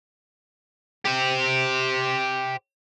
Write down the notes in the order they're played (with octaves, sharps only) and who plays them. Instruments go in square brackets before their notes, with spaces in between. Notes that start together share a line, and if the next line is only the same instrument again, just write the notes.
[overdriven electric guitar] G4 C5